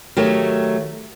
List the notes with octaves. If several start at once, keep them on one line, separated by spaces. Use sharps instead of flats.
D#3 F#3 A3 G4 C#5